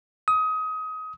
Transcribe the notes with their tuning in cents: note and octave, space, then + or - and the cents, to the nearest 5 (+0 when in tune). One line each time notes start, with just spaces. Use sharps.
D#6 +25